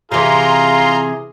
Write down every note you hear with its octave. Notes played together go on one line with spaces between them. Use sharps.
C3 E3 F4 G#4 A#5 C6